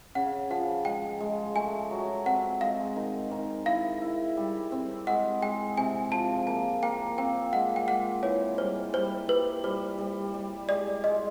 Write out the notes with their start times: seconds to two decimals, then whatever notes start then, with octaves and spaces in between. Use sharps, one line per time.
0.15 C#3 F#5
0.50 F3 F#5
0.85 G#3 G5
1.21 G#3
1.56 A3 G#5
1.91 F#3
2.26 C4 F#5
2.61 G#3 F5
2.96 D#3
3.31 D#3
3.66 E4 F5
4.02 E4
4.37 G3
4.72 C4
5.07 G#3 F#5
5.42 G#3 G5
5.77 C3 G#5
6.12 F3 A5
6.47 A#3 A5
6.82 A#3 G5
7.18 C4 G5
7.53 G#3 F#5
7.76 G5
7.88 G#3 F#5
8.23 E3 C#5
8.58 G3 C5
8.94 G3 C5
9.28 G4 B4
9.64 G3 C5
9.99 G3
10.34 G3
10.69 G#3 D5
11.04 G#3 D#5